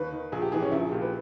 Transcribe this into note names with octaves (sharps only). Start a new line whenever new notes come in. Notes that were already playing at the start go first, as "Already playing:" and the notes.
Already playing: D#2 B4
D#3
A#1 G#4
G4
G#2 E3 G#4
C#4
A#1 E4
G#4
A#2 G4
B4